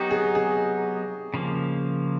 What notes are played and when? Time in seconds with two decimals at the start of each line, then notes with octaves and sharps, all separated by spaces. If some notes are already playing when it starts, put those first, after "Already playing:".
Already playing: F#3 B3 D#4 F#4 G4
0.11 G#4
0.35 G#4
1.34 C#3 F3 A#3